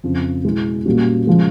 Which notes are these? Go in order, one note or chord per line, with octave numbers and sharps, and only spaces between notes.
F2 C#3 F3
B2 G#3 B3 E4
A#2 G3 A#3 C#4 F#4
C#3 F3 G#3